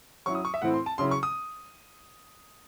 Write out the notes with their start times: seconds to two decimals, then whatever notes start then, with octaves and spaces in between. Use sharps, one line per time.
0.26 F#3 C#4 E4 C#6
0.35 D#6
0.45 C#6
0.54 E5
0.62 A2 E3 C4 E4 F#5
0.74 C6
0.86 A5
0.98 C#3 F#3 C#4 E4 C6
1.11 C#6
1.23 D#6